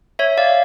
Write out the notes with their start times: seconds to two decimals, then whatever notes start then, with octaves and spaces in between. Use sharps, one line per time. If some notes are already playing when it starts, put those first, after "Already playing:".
0.19 C#5 E5
0.37 D5 F5